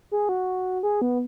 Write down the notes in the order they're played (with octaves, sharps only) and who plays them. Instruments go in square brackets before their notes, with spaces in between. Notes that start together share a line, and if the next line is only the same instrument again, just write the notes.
[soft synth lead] G#4
F#4
G#4
B3